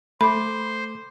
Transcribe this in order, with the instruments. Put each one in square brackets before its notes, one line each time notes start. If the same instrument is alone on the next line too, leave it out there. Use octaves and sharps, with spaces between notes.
[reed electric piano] A3 A4 D6 [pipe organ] C5 [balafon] B5